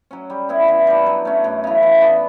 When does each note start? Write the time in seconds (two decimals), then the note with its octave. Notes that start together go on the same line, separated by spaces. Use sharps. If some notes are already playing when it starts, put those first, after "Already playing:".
0.11 F#3 C#4
0.30 G3
0.49 B3 E4
0.68 E3
0.87 G3 D4
1.06 F#3
1.25 A3 C#4
1.44 F#2
1.64 C#3 E3
1.83 E3
2.01 B3 D4